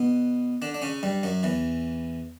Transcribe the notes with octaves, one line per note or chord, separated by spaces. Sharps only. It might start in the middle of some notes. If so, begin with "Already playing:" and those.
Already playing: B2 B3
D3 D4
D4
C#3 C#4
G2 G3
F#2 F#3
E2 E3